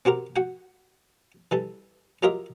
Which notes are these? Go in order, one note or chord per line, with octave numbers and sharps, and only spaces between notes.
C4 F#4 G4 A#4
F#4 F#5 G5
E3 G3 A4
F#3 F4 G4 A#4 D#5 E5